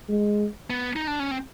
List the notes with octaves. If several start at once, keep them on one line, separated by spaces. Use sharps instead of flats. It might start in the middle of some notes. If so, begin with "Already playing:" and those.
G#3
B3
D#4
D4
C#4
C4